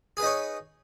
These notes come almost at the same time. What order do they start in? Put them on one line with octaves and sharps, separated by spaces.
G#4 B4 D#4 C#5